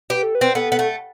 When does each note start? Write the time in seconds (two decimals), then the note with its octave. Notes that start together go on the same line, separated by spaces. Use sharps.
0.10 G4 B4
0.23 A4
0.35 B4
0.41 C4
0.55 B3 A4
0.72 B3
0.79 A3